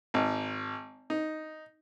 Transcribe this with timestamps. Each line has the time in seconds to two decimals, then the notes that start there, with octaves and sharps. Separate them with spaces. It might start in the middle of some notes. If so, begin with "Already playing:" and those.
0.14 G#1
1.10 D#4